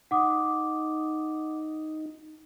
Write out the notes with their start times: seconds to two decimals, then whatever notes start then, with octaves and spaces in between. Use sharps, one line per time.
0.11 D#4 F#5 D6 D#6